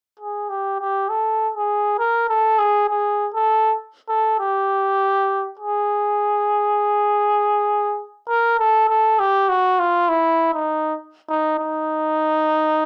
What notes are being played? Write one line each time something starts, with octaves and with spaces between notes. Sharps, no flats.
G#4
G4
G4
A4
G#4
A#4
A4
G#4
G#4
A4
A4
G4
G#4
A#4
A4
A4
G4
F#4
F4
E4
D#4
D#4
D#4